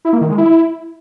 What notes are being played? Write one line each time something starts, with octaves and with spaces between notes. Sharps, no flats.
E4
A#3
D#3
G#3
E4